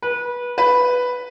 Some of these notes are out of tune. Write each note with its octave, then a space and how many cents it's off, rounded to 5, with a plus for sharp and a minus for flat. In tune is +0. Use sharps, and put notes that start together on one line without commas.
B4 -25
B4 +0